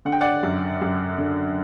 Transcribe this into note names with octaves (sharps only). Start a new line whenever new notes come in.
D3 F#5
G5
D5 F#5
F#2
F#2
D3